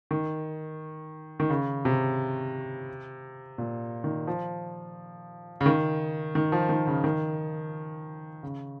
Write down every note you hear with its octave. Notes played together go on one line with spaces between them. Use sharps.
D#3
D#3
C#3
C3
A#2
D#3
F3
C#3
D#3
D#3
F3
D#3
C#3
D#3
C#3